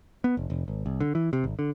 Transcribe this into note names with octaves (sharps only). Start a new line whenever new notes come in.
B3
F1
F1
G#1
C2
D3
E3
C3
G#1
D3